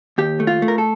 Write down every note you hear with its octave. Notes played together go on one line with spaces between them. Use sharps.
D#2 G4
A3
F4
A3
A#4
A4